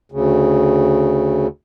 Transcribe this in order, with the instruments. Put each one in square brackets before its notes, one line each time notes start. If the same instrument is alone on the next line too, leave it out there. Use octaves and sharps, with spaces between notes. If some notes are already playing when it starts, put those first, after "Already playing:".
[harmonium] D2 C#3